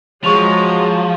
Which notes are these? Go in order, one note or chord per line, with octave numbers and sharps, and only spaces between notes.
F3 F#3 G#3 C#5 A#5 C#6 F7